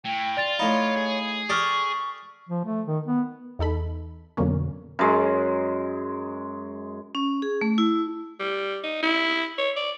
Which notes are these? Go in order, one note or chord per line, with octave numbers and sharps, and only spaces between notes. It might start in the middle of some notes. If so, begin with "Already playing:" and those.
A2 G5
F4 D5 A6 F7
A2 D#4 C#5 F5 B5
G#4
G4 A4 D5 C#6 D#6 F6
F3
A3
D#3
B3
E2 D#4 A4 B5
F2 B2 D3 F#3 A#3 C#4
F#2 G#3
C#4
G#4
A3
E4
G3
D#4
E4
C#5
D5